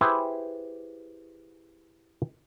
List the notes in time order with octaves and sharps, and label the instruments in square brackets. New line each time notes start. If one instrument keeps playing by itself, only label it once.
[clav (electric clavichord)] E4 G4 G#4 B4 C5 E5